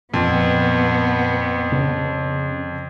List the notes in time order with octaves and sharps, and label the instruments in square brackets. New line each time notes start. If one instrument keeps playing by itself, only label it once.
[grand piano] F2 [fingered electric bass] A#2 [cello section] B3
[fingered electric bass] C#3